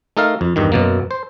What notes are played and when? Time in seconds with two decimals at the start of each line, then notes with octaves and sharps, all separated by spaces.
0.17 A3 D#4 A4 A#4 F5
0.41 F2
0.56 E2 G2 D#3
0.72 F#2 B2 A#3
1.11 C5